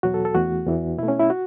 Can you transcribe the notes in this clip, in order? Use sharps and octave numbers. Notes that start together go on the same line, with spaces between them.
E2 B2 F#3 F#4
A4
A4
E2 E3 A3 F#4
E2 E3 B3
B2 A3 E4
C#4
E4
F#4